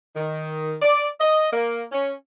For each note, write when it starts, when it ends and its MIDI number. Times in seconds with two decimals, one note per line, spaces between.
0.16 0.75 51
0.82 1.06 74
1.20 1.52 75
1.53 1.82 58
1.92 2.11 61